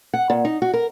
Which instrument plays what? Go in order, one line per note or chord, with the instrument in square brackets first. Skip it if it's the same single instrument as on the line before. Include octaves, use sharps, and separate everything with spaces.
[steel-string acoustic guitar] F#5
A#2
D#4
F#4
A#4